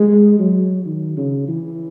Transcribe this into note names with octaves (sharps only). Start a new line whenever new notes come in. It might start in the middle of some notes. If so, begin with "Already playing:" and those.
Already playing: G#3
F#3
D#3
C#3
E3